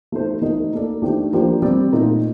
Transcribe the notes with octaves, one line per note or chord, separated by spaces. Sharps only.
A3 D#4 A4 C5
A3 D#4 A#4 D#5
A#3 D#4 A4 D5
D#3 A3 D4 G4 C5
F3 A#3 D4 G4 C5
G3 C4 G4 D5
A#2 A3 D#4 A#4